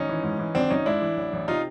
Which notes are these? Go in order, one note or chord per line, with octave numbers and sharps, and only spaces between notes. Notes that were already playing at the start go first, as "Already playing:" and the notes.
Already playing: G#1 C#4 D#4
E3
G#2
E3
G#1 C4 D4
G#1 C#4 D#4
G#2 D4 E4
E3
A1
A1
C3 D#4 F4